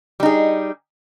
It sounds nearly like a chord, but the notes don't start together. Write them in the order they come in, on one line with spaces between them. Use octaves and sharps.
G3 D#4 G#4